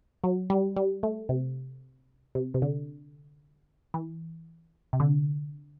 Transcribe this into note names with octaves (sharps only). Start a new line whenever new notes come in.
F#3
G3
G3
A3
C3
C3
C3
D3
E3
C3
D3